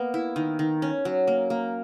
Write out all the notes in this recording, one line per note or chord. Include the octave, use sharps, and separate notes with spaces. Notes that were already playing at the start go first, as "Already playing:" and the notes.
Already playing: A#3 B3
E4
D#3
D#3
C#4
F#3
A#3
A#3